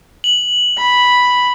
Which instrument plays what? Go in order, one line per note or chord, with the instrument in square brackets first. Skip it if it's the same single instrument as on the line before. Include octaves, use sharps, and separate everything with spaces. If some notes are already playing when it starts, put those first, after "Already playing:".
[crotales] F#7
[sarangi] B5